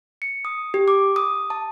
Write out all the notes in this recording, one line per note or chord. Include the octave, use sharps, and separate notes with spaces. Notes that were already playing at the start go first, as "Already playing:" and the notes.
C#7
D#6
G4
D6
D#6
A5